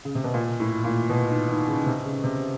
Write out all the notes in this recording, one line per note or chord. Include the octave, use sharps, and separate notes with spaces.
C#3
C3
B2
A#2
A2
A#2
B2
D#3
D#3
C#3
C3
C#3
C3